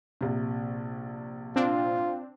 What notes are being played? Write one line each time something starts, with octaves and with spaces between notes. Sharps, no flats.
A#1 C3
C4 D4 F4